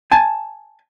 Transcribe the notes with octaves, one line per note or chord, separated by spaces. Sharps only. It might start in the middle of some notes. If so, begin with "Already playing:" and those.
G#5 A5